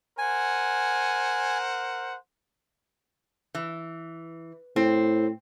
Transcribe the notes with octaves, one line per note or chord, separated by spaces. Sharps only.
A#4 C5 F#5 G#5
E3
A2 C4